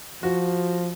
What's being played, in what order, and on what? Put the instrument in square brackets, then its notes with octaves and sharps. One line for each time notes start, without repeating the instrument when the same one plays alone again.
[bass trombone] F3 [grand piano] F#4